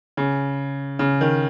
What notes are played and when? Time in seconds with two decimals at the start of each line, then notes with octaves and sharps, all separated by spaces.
0.17 C#3
0.99 C#3
1.21 D#3